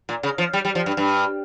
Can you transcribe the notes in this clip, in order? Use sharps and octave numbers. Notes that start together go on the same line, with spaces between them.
A#2
C#3
F3
G3
G3
F3
G2
G2